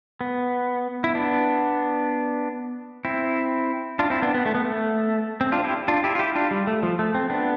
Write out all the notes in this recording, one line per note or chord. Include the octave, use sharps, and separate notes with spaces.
B3
E4
B3 D4
C4 E4
D4 F4
C4 E4
B3 D4
B3
A3
B3
A3
C4
D4 F4
E4 G4
D4 F4
E4 G4
F4
E4 G4
D4 F4
G3
A3
F3
A3
C4
B3 D4